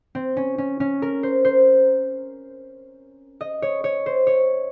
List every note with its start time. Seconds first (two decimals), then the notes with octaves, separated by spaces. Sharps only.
0.15 C4
0.37 C#4
0.58 C#4
0.80 C#4
1.02 A#4
1.23 C5
1.45 C5
3.41 D#5
3.62 C#5
3.84 C#5
4.06 C5
4.27 C#5